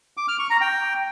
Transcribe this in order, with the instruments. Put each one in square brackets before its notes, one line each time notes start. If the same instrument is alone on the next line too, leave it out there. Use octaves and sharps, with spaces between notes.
[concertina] D6
F6
C#6
A#5
G5